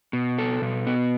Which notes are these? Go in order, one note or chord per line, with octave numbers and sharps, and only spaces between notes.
B2
A4
B2
B3